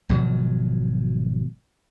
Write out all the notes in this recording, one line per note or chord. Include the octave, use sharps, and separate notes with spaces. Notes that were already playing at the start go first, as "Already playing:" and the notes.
G#1 B2 F3 F#3